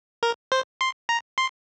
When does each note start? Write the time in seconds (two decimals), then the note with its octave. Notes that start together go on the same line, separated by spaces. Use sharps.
0.23 A#4
0.52 C5
0.81 C6
1.09 A#5
1.38 C6